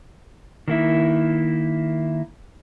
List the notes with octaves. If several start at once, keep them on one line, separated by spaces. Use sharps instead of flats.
D#3 A#3 E4